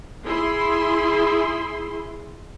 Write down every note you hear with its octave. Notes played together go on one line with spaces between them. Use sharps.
E4 G#4 C6